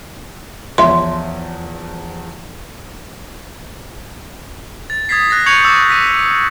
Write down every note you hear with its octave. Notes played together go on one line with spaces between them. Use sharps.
E2 F3 C#5 E5 C6
A6
D#6 G#6 A6 B6 C7
F#6 A#6
C#6 G6 G#6 C#7 F7 F#7
D6 E6
B6 D#7